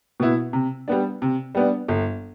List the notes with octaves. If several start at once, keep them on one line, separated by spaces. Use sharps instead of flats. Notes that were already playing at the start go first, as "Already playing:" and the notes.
B2 B3 E4
C3
G3 B3 D4
C3
G3 B3 D4
G1